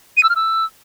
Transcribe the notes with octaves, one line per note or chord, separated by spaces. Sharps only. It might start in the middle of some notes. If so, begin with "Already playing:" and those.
D#7
E6
F6
E6